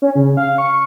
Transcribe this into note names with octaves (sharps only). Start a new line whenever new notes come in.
C#4
C#3
F5
C#6